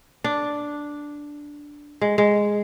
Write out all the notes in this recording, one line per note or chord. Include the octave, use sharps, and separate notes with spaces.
D4
G#3
G#3